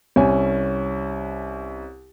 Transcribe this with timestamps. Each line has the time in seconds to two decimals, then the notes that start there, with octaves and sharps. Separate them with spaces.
0.16 C2 C#4 G#5